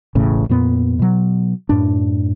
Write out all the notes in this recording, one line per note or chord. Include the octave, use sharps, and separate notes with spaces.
E1 A1 A2 C#3
F2 A#2 B3
B2 F#3
F#2 A2 D4